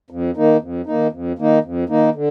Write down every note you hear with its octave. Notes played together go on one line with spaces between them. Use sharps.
F2
D#3 A#3 D#4
F2
D#3 A#3 D#4
F2
D#3 A#3 D#4
F2
D#3 A#3 D#4
D3